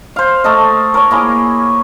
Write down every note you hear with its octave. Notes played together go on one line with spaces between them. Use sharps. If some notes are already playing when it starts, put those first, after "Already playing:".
C5 F5
A3 A4 D#5
A#4 C#5
A#3 E4 G#4